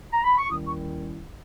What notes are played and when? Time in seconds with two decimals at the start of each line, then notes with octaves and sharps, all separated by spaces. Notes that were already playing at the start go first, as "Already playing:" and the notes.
0.11 A#5
0.24 B5
0.38 C#6
0.50 D#2 D#3 G3 C#4 E4 D#6
0.67 C#6